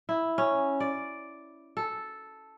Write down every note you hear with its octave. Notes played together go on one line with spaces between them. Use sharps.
E4
C#4
D5
A4